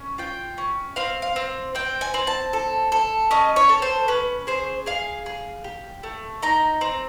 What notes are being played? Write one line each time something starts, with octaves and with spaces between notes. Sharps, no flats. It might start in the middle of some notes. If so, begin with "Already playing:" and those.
Already playing: C#4
F4 G5
C#4
C4 F5
F5
C4
C4 G5
G#5
C4
A5
A4
A4
C#4 D#5
C#5
A4
C5
C#4 B4
G#4 C5
G#4 F5
G#4
G4
A3
D#4 A#5
C4